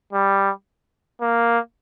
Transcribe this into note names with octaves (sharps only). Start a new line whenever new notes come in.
G3
A#3